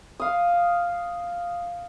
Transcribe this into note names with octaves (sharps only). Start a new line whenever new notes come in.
F5 D#6